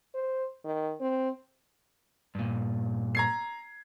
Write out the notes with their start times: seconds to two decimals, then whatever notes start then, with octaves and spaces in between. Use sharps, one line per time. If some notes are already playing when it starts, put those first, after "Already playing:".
0.14 C5
0.64 D#3
1.00 C4
2.35 G2 A#2
3.15 A#5 G#6 C7